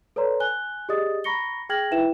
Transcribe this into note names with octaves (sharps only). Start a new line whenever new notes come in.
A4 B4 C#5 D5 A#5 C6
G#5 F#6 G7
G4 G#4 D5 D#5 D#6 A6
A#5 B5 C#6 A#6 C#7 G7
G#4 G5 F6 G#6 A#6 F#7
D#4 E4 B4 E5 G5 E7